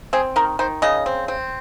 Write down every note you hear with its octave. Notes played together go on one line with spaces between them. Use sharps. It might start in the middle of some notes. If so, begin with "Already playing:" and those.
C4 G#4
D#3 A#4
D#3 C5
C#3 D#5
C4
C4